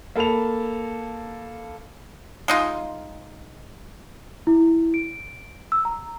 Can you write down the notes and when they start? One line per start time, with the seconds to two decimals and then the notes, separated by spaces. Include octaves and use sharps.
0.16 A#3 A4 B5 E7 F7
2.48 G#3 D#4 F4
4.47 E4
4.94 D7
5.72 E6
5.85 A#5